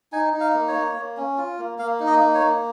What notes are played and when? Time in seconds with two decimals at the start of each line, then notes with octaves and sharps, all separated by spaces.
0.12 D#4 G#5
0.33 D#4
0.40 F5
0.54 A#3
0.68 C#5
0.75 A#3
0.96 A#3
1.17 C#4
1.38 F4
1.58 A#3
1.79 A#3 F5
2.00 D#4
2.07 D#5
2.20 A#3
2.35 C#5
2.41 A#3